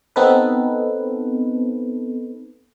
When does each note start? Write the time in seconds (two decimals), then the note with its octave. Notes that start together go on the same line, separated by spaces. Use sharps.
0.16 B3 C4 D#4 A4 B4